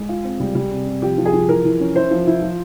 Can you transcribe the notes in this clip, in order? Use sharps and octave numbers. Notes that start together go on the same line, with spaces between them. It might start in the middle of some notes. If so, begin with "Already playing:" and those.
Already playing: G#3 G#4
F4
C4
G3
G3
C3
C3
F3 G4
F3
G#4
F3
E3 A#4
E3
C#4
E4 C5
F3
E4
F3